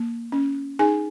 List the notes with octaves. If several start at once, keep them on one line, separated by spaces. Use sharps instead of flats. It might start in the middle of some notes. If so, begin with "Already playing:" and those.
Already playing: A#3
C#4
D#4 G#4 G#5